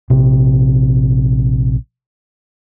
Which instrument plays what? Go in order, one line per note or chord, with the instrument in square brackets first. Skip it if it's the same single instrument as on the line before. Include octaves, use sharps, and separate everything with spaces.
[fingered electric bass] A#1 C3